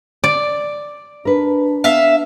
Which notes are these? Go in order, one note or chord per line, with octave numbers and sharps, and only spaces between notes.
D5
D4 A#4 B4
B3 E5 F5